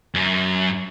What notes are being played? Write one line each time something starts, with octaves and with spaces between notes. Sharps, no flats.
F#2